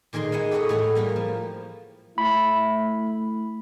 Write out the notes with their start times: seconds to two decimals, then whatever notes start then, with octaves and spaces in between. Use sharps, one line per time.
0.13 A#2 D#3 G#4 A#4 C6
0.32 G#3 E4 F#5 G#5
0.51 G4 A4 B4 C#5 D#5 F#5
0.69 A2 A3 G#4 F#5
0.95 G3 A#3 A#4 B4
1.16 F3
2.18 A3 E4 B5